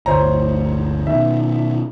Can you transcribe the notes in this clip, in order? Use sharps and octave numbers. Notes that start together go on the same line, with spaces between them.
G1 D2 A2 C5 C#5 A#5
B2 D#3 E5